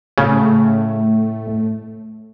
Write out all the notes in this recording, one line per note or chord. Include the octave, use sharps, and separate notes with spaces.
A2 C#3 A3